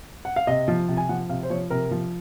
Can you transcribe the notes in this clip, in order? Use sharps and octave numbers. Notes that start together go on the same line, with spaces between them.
F#5
F5
C3 D#5
F3
C3
G#5
F3 F#5
C3 F5
C5
F3 C#5
C3 A#4
F3